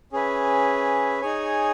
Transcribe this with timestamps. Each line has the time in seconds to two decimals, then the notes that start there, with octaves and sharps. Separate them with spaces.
0.12 C#4 G#4 B4 E5
1.21 D#4 G#4 C#5 G#5